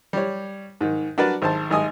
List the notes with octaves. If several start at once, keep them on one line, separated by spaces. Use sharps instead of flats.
G3 C#5
G#2 D#3
D4 F#4 A#4 B4 D5
G#1 C5 A5
G#1 G#3 G#5 D#6